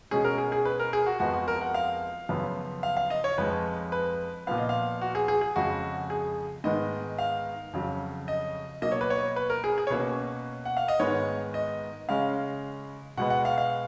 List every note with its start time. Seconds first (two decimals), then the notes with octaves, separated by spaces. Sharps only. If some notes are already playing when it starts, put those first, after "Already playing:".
0.11 B2 G#3 C#4 G#4
0.24 A#4
0.38 G#4
0.52 G#4
0.65 B4
0.80 A#4
0.93 G#4
1.06 F#4
1.20 F2 F3 G#3 B3 F#4
1.33 F#4
1.48 A#4
1.61 F#5
1.74 F5
2.29 F#2 C#3 F3 B3
2.83 F5
2.97 F5
3.10 D#5
3.24 C#5
3.38 F2 F3 G#3 B4
3.92 B4
4.47 A#2 F3 B3 F5
4.58 D#5
4.69 F5
5.01 F#4
5.15 G#4
5.28 G#4
5.41 G#4
5.56 F2 C#3 G#3 F#4
6.10 G#4
6.64 G#2 D#3 G#3 B3 D#5
7.19 F5
7.73 F2 C#3 F#3
8.28 D#5
8.82 B2 F#3 A#3 D#5
8.92 C#5
9.01 B4
9.10 C#5
9.36 B4
9.50 A#4
9.64 G#4
9.78 G#4
9.87 C#5
9.90 B2 A#3 C#4 B4
10.65 F#5
10.77 F5
10.88 D#5
11.00 G#2 D#3 G#3 B3 C#5
11.54 D#5
12.09 C#3 G#3 C#4 F5
13.17 B2 G#3 B3 F#5
13.30 F#5
13.45 F5
13.58 F5